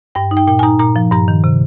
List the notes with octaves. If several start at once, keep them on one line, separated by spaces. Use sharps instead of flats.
G2 G5
D#4
G5
A#2 G5
G#5
D#4 A#5
A#2 A#5
F3
G2 A#5
D#3
C3